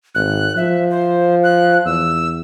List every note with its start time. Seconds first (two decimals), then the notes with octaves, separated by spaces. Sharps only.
0.15 G#1 F#6
0.57 F3 E5
0.90 C5
1.44 F#6
1.85 E2 E6